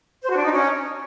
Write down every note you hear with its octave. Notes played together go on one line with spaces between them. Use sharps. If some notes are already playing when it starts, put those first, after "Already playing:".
C5
F#4
D4
D#4
C#4